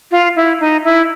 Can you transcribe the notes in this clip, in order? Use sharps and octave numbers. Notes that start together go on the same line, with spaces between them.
F4
E4
D#4
E4